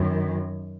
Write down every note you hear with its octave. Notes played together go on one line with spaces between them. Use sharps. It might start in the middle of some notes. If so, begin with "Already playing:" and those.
Already playing: F#2 D#3